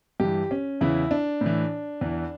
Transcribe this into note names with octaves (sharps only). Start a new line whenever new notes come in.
G2 E3 G4
C#4
E2 C#3 E3 E4
D4
A2
E3
E2 E3